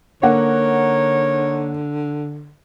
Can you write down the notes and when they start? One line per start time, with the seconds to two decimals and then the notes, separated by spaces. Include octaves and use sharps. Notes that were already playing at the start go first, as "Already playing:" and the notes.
0.23 D3 A#3 D#4 A#4 C#5 F#5